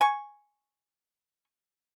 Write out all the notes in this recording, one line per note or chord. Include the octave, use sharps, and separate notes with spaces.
G#5 C#6